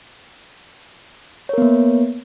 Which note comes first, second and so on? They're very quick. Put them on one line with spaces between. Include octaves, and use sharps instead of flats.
C#5 A#4 B3 A#3